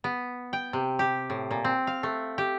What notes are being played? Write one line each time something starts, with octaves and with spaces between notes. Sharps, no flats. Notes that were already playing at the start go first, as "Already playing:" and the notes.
B3
G5
C3
G4
A2
A#2
C4
F5
A3
G4